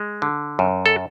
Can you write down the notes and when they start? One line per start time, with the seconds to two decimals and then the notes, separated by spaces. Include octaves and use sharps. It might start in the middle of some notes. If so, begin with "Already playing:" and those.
Already playing: G#3
0.22 D3
0.59 F#2
0.86 A4